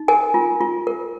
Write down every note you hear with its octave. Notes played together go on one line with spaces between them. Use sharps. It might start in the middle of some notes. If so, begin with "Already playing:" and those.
Already playing: D#4
A#4 G#5
F4
F4
A#4